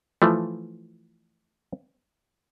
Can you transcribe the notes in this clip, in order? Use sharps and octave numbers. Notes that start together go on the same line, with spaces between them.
E3 F3 A3